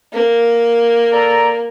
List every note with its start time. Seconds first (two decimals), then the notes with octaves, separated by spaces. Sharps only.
0.13 A#3
1.11 A4 D5 A#5